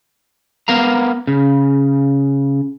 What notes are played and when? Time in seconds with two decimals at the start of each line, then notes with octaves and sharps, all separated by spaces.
0.68 B3 A#4 F5 A#5
1.27 C#3